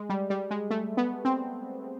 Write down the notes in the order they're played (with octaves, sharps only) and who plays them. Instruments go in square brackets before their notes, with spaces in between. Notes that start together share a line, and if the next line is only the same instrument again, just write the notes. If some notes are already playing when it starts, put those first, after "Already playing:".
Already playing: [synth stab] G#3
G3
G3
G#3
A3
B3
C4